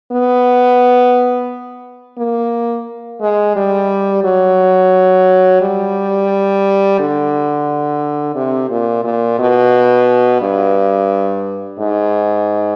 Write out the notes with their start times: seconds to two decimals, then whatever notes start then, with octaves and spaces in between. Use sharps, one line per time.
0.12 B3
2.18 A#3
3.21 G#3
3.56 G3
4.24 F#3
5.62 G3
6.99 D3
8.35 C3
8.70 A#2
9.04 A#2
9.39 B2
10.41 G2
11.79 G#2